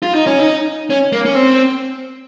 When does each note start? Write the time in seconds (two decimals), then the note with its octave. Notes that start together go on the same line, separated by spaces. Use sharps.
0.03 F4
0.15 D#4
0.27 C#4
0.39 D#4
0.90 C#4
1.13 A#3
1.26 C#4
1.35 C4